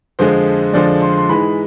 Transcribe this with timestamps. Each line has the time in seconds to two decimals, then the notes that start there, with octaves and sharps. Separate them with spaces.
0.19 F2 D3 F3 G#3 C5
0.73 F2 D3 F3 G#3 D5
1.02 C6
1.17 C6
1.29 G#2 E3 G#3 B5